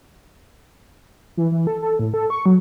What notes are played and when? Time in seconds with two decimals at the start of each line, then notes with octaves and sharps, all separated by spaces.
1.37 E3
1.51 E3
1.67 A4
1.82 A4
1.99 A2
2.14 A4
2.30 C#6
2.46 F#3